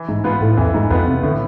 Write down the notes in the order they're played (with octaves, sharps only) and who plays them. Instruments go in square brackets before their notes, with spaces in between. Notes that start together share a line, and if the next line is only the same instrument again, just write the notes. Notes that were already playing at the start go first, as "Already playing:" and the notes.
Already playing: [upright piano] E3
[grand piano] G#2
[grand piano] G#2 [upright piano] B3 F4 B4
[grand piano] A2
[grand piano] F2 [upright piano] E3
[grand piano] G#2
[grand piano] F2 [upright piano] B3 F4 B4
[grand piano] C3
[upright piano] A2 [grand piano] D3